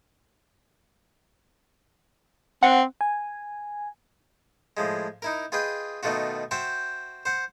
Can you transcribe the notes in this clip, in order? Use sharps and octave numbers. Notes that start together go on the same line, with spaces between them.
C4 F#5
G#5
A2 F3 G#3
D#4 E4 A#4
F4 G#4 B4 D#5 G5
B2 D#3 A3 F4 F#4
F#4 C5 E5 G5 A5 C6
C5 F#5